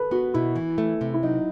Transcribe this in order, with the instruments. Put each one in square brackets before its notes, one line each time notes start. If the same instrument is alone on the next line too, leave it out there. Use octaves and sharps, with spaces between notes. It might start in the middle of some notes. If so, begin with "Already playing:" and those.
Already playing: [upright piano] A4 B4
[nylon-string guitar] B3 [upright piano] F#4
[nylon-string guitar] B2 [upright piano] E4
[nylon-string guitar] E3
A3
C3
[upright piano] E4
[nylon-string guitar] F#3 [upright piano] D#4